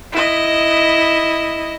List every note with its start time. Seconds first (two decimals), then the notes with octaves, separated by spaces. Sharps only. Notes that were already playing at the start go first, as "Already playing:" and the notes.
0.12 E4 D#5